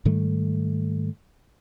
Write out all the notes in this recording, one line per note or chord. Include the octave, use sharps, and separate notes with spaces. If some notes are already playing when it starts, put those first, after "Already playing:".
G#2 D#3 G3 A3